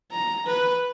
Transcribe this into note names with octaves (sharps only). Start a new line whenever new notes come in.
A#5
B4